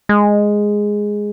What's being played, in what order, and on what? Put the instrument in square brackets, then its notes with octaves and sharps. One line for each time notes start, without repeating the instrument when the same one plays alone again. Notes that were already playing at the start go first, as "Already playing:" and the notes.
[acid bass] G#3